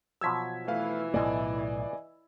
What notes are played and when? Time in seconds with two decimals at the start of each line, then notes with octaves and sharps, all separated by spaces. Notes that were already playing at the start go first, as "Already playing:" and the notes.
0.21 B2 F3 F#3 E6 G#6 B6
0.68 E3 A3 B4 F5
1.14 B1 A2 A3 D5 D#5 G#5